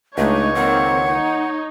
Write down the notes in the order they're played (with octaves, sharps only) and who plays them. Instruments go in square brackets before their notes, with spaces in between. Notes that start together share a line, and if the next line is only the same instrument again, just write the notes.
[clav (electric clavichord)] C#2 G#3 [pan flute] A3 [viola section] D4 D#4 [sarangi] C#5
[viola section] D#3 A#3 C4 [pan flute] F#5
[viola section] D#4